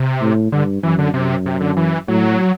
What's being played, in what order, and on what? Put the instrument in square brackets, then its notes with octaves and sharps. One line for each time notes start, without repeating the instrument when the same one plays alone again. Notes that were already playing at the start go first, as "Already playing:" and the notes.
Already playing: [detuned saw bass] C3
[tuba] A2
[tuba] G2 [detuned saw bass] D3
[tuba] F#2 [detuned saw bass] E3
[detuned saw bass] D3
[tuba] F#2 [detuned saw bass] C3
[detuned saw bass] C3
D3
E3
[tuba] A2 [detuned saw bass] F#3